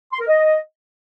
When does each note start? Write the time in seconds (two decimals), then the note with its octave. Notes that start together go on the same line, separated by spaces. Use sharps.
0.13 C6
0.20 A#4
0.28 D#5